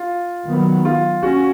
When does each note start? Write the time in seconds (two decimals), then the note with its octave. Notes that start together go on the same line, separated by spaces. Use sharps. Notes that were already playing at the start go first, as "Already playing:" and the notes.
Already playing: F4
0.46 D#3 F#3 B3
0.85 F4
1.23 C#4 F#4